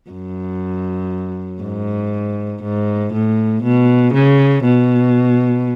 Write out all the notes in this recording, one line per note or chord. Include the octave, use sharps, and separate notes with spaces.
F#2
G#2
G#2
A2
B2
C#3
B2